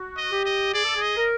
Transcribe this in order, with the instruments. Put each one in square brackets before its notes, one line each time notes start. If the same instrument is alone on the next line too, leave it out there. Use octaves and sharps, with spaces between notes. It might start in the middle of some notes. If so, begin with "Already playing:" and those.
Already playing: [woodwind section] F#4
[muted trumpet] D#5
[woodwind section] G4
[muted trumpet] D#5
[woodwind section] G#4 [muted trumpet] D5
[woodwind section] A4
G#4
[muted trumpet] D#5
[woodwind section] A#4